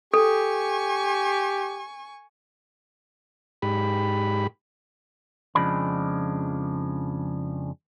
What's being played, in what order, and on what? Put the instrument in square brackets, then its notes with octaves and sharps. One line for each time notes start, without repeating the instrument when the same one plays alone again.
[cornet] G4 [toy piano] A4 [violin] G#5 C#6
[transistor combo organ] G#2 G4 B5
[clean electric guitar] F2 C#3 F3 G#3 D4 B5